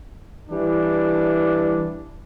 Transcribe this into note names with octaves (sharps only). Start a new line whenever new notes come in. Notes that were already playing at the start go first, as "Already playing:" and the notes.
E3 G3 D4